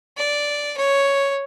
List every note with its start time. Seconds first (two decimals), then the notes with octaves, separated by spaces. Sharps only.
0.17 D5
0.77 C#5